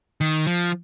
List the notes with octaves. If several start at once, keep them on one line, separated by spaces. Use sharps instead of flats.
D#3
F3